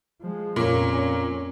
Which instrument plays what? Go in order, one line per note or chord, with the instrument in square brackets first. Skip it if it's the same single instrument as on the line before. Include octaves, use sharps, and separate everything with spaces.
[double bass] F3 G#3
[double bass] F2 C#4 [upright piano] A#2 A#3